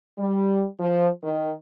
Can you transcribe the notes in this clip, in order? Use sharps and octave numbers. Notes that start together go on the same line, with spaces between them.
G3
F3
D#3